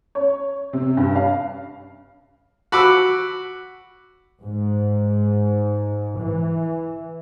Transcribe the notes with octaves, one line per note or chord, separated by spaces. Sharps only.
C#5
C3
G2
F5
F#4 B5 D6 E6
G#2
E3